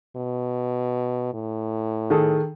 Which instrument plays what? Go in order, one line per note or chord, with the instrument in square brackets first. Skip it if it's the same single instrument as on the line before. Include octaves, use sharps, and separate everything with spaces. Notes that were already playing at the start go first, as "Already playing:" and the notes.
[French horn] B2
A2
[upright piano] D#3 G#4 A4